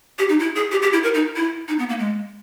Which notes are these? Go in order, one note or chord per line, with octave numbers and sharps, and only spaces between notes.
G4
D#4
E4
G#4
G4
G4
E4
A#4
D#4
E4
D#4
B3
A#3
G#3